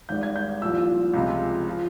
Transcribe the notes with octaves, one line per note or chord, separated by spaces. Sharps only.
G#1 G#2 D#3 G3 G6
G#6
G6
C2 A#2 F3 E6
C#2 C3 F3 G#3
F3